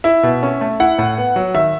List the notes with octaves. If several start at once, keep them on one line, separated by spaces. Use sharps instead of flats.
E4 E5
B2
C#4
A3
E4 F#5
A2
B3
F#3
D#3 E5